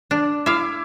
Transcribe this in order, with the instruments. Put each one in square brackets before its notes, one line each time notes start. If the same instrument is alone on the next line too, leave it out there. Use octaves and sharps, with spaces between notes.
[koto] D4
[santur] E4 D6 [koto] E5 F5